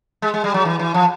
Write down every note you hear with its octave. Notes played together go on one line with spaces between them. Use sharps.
G#3
G#3
G3
F#3
E3
E3
F3